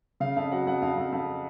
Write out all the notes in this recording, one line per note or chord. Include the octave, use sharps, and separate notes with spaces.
C#3 F5
F2 F5
F#3 F#5
F2 F#5
F2 F5
F2
F2